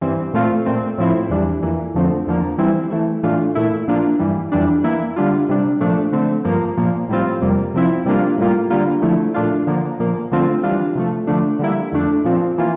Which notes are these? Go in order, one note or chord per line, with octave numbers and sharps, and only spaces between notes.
G2 E3 G3 C4
A#2 A3 C4 F4
A#2 A3 C4
A2 F3 C4 E4
E2 E3 G3 D4
F2 E3 A#3
F2 D3 F3 A3 C4
E2 D3 F3 A#3
E3 G3 C4 E4
E3 A3 E4
A2 E3 A3 D4 F4
A#2 A3 E4
A#2 F3 A#3 D4 F4
G2 E3 G3
F2 E3 G3 D4
E3 A#3 E4
D3 G3 D4 F4
C3 G3 D4
A#2 F3 A3 D4
D3 A3 C4
G2 F3 A#3
A#2 F3 A#3
A2 G3 C4 F4
F2 C3 G3 A#3
C3 F3 C4 E4
C3 G3 A#3 D4 F4
A2 G3 A#3 F4
D3 G3 A#3 F4
D3 F3 A3 E4
A#2 A3 D4 F4
D3 F3 A#3
A#2 F3 A#3
D3 F3 A3 C4 F4
E3 G3 D4 F4
C3 F3 A3
D3 F3 A3 D4
D3 G3 A#3 E4
F2 D3 A3 D4
A#2 F3 C4
E3 A#3 F4